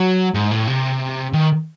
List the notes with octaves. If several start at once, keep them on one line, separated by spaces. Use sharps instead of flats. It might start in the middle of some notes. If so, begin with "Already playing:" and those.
Already playing: F#3
G#2
A2
C3
D#3